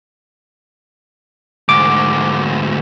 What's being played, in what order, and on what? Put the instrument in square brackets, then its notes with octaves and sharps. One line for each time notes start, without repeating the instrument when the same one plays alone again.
[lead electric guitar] D2 G#2 [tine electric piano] D6